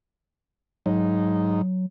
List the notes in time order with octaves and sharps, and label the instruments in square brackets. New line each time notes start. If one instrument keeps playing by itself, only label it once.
[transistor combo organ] G#2 D#4 [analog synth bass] F#3